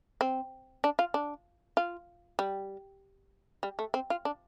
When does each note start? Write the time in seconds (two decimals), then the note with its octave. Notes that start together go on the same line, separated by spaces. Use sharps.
0.21 C4
0.84 D4
0.99 F4
1.14 D4
1.77 F4
2.39 G3
3.63 G3
3.79 A3
3.94 C4
4.10 F4
4.25 D4